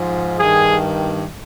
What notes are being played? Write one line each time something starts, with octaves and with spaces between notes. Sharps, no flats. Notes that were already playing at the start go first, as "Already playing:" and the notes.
Already playing: G#2 F3
G2 D#3 G#4